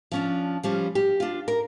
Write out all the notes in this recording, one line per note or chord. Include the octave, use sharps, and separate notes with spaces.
F3 C#4 D4
F3 G3 C#4
G4
D4 F4
A#4